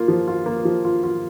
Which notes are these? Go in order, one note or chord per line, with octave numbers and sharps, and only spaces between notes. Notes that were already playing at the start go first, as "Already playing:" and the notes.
Already playing: A#3 F4
F3
F4
A#3
F3
F4
F4